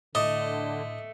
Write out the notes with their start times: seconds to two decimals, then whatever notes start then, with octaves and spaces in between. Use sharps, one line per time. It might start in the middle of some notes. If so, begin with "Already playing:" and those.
0.15 A2 D3 A3 D#5 D6